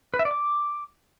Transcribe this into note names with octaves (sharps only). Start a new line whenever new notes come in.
B4
E5
D5
D6